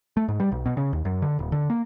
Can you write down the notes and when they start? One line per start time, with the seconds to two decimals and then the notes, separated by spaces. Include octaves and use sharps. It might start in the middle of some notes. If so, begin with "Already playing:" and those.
0.17 A3
0.28 G#2
0.40 G3
0.52 B1
0.66 B2
0.77 C#3
0.93 D#2
1.05 F#2
1.22 D3
1.39 D#1
1.52 D3
1.70 A#3